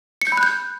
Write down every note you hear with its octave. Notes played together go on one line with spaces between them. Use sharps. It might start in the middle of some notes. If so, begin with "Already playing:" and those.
C#7
G6
B5
F#6
G6